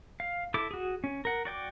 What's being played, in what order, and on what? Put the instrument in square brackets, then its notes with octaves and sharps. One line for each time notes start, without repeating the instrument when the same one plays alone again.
[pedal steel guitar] F5
E4 A4 D6
F#4 G#4
C#4
A#4 F#5
F#4 D5 G5 D6